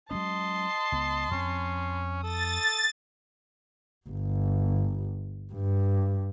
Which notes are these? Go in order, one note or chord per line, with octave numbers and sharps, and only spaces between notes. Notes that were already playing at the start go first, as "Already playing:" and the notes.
F#3 G#3 C#4 D#5 A5 C6
C#2 B3
F2 A#3 C4 C#4
A4 D#6 A6
G1
G2